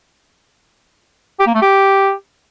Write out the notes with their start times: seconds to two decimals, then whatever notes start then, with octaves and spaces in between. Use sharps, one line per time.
1.40 G4
1.47 A#3
1.54 A3
1.62 G4